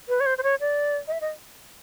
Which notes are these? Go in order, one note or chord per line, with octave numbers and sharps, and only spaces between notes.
B4
C#5
C5
C5
C#5
D5
D#5
E5
D#5